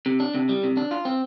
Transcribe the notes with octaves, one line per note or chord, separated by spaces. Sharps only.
C3
D4
C3
G3
C3
D4
F4
C4